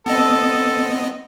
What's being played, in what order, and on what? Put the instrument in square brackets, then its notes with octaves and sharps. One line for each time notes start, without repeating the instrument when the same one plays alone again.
[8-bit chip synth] B3 C4 D#5 [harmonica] A4